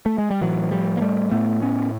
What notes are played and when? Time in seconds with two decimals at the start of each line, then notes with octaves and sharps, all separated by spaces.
0.06 A3
0.18 G#3
0.31 G3
0.41 A2 E3 F#3
0.71 F3 G3
0.97 A#3
1.01 G3 A3
1.31 A2 A3 B3
1.62 B3 C#4